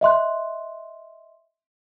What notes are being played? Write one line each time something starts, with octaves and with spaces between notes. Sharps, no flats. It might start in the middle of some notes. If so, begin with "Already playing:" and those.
D#5 E5 C6 F#6